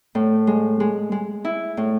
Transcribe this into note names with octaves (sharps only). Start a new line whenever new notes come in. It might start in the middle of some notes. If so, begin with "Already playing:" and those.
A2
G#3
G#3
G#3
E4
A2